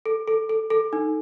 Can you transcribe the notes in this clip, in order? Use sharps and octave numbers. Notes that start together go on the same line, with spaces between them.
A4
A4
A4
A4
D#4